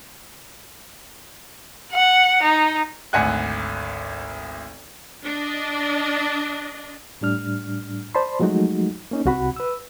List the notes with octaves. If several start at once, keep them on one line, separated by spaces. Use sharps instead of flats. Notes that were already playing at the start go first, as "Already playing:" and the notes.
F#5
D#4
G#1 D2 F#5 G#5 F#6
D4 D#5
A2 G3 D4 F6
C5 D5 A5 B5 C6
F3 F#3 G#3 A3 D#4 F#4
A#3 C#4 D#4
C2 C3 F#4 F#5 B5
B4 E6